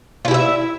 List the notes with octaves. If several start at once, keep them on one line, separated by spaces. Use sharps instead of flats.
E4 F4 G4 E5